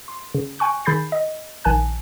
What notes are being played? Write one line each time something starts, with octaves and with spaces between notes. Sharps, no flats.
C6
C#3
G5 G#5 C#6 F#6
D#3 G#4 B5 G6 A6 C7
D#5
A#1 D#3 G#5 A5 F#6